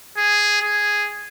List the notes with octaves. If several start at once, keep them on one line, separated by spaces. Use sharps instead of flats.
G#4
G#4